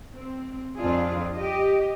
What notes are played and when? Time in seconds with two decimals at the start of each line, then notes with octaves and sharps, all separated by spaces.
0.14 C4
0.78 F2 D4 F4 G#4
1.36 G4 D#5